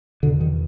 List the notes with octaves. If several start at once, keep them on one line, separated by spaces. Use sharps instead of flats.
E2 B2 D3
D#3